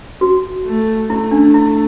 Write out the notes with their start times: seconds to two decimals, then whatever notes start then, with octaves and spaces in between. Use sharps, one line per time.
0.21 F#4
0.66 A3
1.10 A3 E4
1.31 D4
1.54 E4